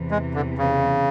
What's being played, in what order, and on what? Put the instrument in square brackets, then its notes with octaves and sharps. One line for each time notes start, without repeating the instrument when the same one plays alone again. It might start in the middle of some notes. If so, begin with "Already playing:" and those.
Already playing: [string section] E2 C3 E3
[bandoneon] G#3
D3
C#3